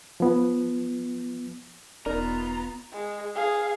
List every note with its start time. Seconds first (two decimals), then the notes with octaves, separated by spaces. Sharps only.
0.20 F3 B3
2.06 E1 B3 D#4 F4 A#4 D5 A#5
2.93 G#3
3.35 G#4 F5